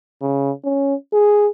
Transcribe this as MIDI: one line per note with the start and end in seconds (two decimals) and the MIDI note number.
0.22 0.52 49
0.65 0.95 61
1.13 1.48 68